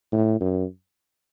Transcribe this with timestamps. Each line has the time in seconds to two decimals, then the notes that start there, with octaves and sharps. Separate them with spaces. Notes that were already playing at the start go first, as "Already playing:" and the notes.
0.12 A2
0.40 F#2